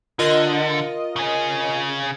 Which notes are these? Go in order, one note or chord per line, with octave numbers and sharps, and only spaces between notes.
D3 F4 A#4 D#5
C#3 G#4